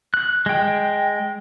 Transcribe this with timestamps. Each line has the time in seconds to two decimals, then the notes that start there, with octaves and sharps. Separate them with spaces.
0.14 F#6
0.46 G#3 G5